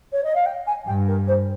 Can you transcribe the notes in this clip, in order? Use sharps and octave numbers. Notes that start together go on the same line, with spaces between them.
C#5
D#5
F5
G5
G#5
G2 G5
A#4
C5